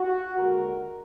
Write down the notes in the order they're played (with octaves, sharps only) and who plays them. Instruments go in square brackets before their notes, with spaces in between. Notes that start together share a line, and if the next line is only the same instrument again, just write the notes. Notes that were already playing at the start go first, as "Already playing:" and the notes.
Already playing: [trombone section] F#4
D#2 D3 G#3 A#4